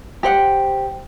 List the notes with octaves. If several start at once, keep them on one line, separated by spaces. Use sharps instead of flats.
G4 C5 F#5